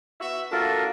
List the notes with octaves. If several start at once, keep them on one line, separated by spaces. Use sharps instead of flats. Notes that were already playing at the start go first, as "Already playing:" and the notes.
B3 F#4 E5
A#3 D4 F4 F#4 A4 A#4